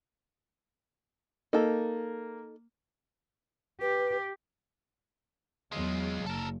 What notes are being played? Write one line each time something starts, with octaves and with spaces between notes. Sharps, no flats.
A#3 D#4 A4
G4 B4
E2 F#3 G#3 F4
F#1 A4 A#4